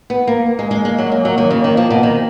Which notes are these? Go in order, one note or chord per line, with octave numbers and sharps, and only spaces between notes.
B3
A#3
A#3
G#3
G#3
G#3
F#3
G#3
F#3
D#3
C#3
D#3
F3
B2
D#3